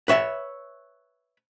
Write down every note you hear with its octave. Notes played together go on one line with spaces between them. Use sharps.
B4 C#5 E5